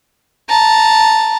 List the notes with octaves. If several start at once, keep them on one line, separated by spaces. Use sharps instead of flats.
A5 A#5